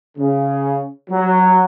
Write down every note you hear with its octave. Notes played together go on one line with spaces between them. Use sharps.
C#3
F#3